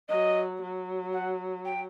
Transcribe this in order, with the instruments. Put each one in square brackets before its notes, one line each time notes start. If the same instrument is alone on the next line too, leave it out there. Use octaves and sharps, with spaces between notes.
[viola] F#3 [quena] D#5
[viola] F#3
[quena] F#5
G5